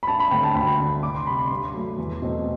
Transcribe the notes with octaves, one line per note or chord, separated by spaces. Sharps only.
B5
G2 A5
B5
D3 A3 C4 G5
A5
D2 B5
D3 A3 D4
C2 D6
C6
C3 G3 B5
C6
G2
F#3 A3
E2
B2 A3 C4